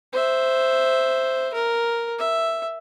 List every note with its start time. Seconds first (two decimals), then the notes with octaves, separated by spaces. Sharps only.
0.13 C5 E5
1.54 A#4
2.18 E5